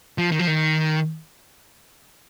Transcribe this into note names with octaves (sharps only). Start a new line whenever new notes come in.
F3
D#3
F3
D#3